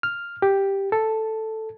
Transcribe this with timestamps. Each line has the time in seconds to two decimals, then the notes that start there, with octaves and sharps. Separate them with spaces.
0.03 F6
0.42 G4
0.92 A4